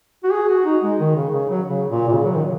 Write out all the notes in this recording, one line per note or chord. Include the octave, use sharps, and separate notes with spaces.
F#4
G#4
F#4
D#4
G#3
D#3
C#3
C#3
F#3
C#3
A#2
A#2
C#3
F#3
D#3